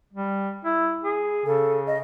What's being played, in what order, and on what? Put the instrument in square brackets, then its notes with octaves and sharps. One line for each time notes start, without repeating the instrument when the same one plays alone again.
[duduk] G3
E4
G#4
[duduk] C#3 [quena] A4
[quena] D#5